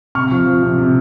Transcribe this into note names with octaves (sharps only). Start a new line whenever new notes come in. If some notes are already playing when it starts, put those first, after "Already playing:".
C3 C#6 F6
F3
F3
C3
C3